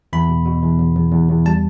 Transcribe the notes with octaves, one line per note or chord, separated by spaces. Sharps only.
E2 B5
B2
B2
E2
E2
E2
E2
E2
G3 A5